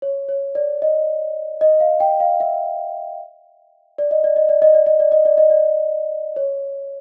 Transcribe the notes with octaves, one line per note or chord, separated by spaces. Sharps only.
C#5
C#5
D5
D#5
D#5
F5
G5
F5
E5
D5
D#5
D5
D#5
D5
D#5
D5
D#5
D5
D#5
D5
D#5
D5
C#5